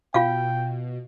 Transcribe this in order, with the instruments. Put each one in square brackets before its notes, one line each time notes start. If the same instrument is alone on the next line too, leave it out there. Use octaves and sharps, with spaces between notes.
[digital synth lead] B2 [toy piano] F4 F5 [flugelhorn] G5